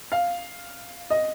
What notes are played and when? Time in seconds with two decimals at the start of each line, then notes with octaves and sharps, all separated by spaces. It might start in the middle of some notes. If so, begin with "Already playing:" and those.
0.12 F5
1.10 D#5